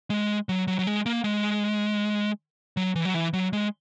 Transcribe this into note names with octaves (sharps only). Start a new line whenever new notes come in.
G#3
F#3
F#3
F#3
G#3
A#3
G#3
F#3
E3
F#3
E3
F#3
G#3